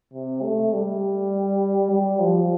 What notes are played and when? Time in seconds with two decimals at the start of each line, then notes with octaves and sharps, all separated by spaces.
0.13 C3
0.43 A3
0.73 G3
1.92 G3
2.21 F3